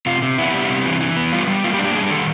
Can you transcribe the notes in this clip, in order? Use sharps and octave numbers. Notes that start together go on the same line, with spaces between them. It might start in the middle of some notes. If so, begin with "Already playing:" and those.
C3 F4
C3
B3 E4
G3
C3
E3
E3
B3
G3 F4
G3
A#3 F4
G4
D4
G4
G3 G#4
D#3 A4